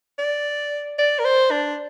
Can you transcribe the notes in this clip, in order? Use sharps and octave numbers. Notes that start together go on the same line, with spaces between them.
D5
D5
A#4
C5
D4